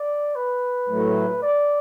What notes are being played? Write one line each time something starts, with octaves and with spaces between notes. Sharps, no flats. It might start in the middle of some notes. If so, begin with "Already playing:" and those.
Already playing: D5
B4
A2 F#3 A3
D5